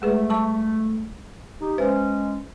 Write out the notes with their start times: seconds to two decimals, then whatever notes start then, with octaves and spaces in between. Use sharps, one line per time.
0.02 G#3 A3 G#4 B4
0.30 G3 A5 C#6
1.60 D#4 G4
1.78 G#3 C#4 B4 C5 E5